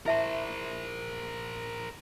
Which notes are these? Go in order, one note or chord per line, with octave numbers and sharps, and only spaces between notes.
E4 A#4 C5 E5 A5